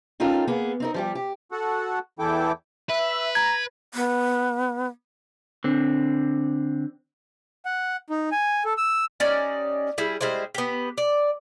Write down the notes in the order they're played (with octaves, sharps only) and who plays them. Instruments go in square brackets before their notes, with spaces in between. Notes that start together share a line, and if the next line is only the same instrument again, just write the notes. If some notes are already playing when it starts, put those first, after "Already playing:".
[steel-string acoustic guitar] C4 C#4 D#4 F4 A4 A#4
A#3 B3 G#4
C4 D#4 A#4
F3 G3 G4
G4
[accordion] F#4 A4 F#5
E2 E3 E4 A4 G5 D6
[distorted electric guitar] B4 [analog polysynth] E5
[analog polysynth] A#5 [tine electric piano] G#6
[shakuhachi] B3
[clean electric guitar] D3 C4
[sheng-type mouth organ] F#5
D#4
G#5
A4
E6
[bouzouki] C#4 D#4 G4 D5
G3 E4 G#4
G3 G#3 E4 C5
B3 G4
D5